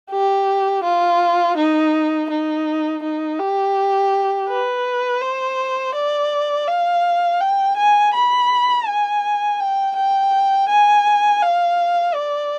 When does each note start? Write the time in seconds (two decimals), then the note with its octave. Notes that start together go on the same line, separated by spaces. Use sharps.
0.11 G4
0.84 F4
1.57 D#4
2.30 D#4
3.03 D#4
3.39 G4
4.49 B4
5.21 C5
5.95 D5
6.68 F5
7.41 G5
7.77 G#5
8.14 B5
8.87 G#5
9.60 G5
9.96 G5
10.69 G#5
11.42 F5
12.15 D5